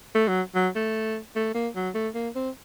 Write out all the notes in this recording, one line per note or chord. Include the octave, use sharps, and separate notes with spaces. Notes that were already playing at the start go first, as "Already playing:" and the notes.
A3
F#3
F#3
A3
A3
A#3
F#3
A3
A#3
C4